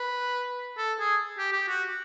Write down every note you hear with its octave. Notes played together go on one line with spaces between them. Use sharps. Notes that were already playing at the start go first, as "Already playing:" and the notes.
Already playing: B4
A4
G#4
G4
G4
F#4